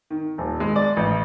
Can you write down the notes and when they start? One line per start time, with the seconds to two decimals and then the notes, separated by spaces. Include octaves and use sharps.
0.10 D#3
0.38 D#1
0.60 G#3
0.76 D5
0.97 A1